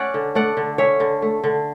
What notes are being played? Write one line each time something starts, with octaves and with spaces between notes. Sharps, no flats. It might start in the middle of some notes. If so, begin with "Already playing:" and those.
Already playing: C#4 D5 F#5
D3
A3 D5 F#5
D3
C#4 C#5 E5
D3
A3
D3